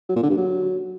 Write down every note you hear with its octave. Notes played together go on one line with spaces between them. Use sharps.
F#3
A#2
D3
G2
F#3